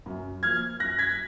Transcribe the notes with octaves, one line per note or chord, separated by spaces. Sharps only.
F#2
F3 A#3 F6 G#6
F#2 F#6 A#6
G#6 B6